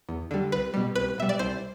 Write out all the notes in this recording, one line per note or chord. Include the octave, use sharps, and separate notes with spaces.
E2
D3 G3
C2 B4
B2 G3
C2 B4
B2 G3 E5
D5
C2 C5